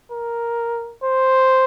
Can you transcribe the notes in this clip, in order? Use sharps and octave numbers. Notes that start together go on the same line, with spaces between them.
A#4
C5